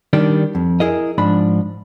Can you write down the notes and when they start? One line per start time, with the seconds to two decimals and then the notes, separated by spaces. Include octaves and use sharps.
0.13 D#3 G3 D4
0.55 F2
0.80 E4 G#4 A#4 D#5
1.18 G#2 F3 D4 B5